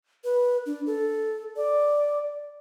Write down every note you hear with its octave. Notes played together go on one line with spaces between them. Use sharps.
B4
D4
A4
D5